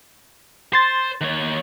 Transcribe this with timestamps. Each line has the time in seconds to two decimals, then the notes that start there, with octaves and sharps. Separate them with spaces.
0.73 C5 C6 A6
1.21 D#2 C#5